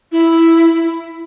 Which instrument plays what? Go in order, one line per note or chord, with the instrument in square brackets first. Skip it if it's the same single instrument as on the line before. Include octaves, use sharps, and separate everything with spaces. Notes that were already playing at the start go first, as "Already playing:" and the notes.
[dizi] E4